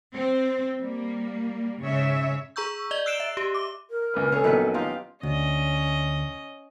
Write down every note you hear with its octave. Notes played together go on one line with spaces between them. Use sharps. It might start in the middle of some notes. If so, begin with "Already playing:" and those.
C4
G3 A#3
G#2 C#3 C#5 E5
G#4 A#5 C#6 E6 G6
D5 D#5 G7
E6 F#6 C7 D7 E7
E5
G4
D6
A#4
C#2 A#2 B4
C#4 G#4 A4
A#1 D#3 F#3 B3 B4
D#4 F4 G4 F5
D2 C#4 D#5